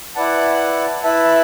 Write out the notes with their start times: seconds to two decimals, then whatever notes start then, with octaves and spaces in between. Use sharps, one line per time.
0.15 E4 B4 D5 F#5 A5
1.03 E4 B4 E5 A5